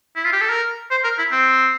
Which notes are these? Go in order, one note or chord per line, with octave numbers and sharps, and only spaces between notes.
E4
F4
G4
A4
A#4
C5
A#4
E4
C4